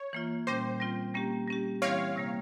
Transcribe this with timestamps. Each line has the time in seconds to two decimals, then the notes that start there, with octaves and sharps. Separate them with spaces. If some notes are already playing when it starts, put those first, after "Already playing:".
Already playing: C#5
0.13 E3 A#3 F4
0.47 A#2 G3 C#4 C5
0.80 G3 C4 F4
1.14 G3 A#3 C#4 G4
1.48 G3 C#4 G4
1.82 E3 G3 C4 E4 C#5 F5
2.16 C3 G3 A#3